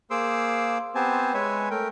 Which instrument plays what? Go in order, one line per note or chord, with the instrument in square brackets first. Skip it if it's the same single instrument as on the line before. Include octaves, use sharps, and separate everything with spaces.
[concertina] A#3 G#4 C5 C6 D6 E6
B3 C4 G4 C5 G#5 A5
G#3 B4 C#5 E5 G#5
A3 A#4 G5